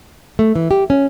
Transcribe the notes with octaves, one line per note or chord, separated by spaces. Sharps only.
A3
E3
G4
C#4